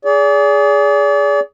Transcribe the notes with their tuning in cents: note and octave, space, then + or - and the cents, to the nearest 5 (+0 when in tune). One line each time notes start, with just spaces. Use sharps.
G#4 +0 D5 -40